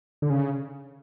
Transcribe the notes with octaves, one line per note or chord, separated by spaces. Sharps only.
D3
C#3